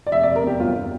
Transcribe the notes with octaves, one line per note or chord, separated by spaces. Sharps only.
D5
F1 E5
D5
F1
A#4
E2 G4
G1 F4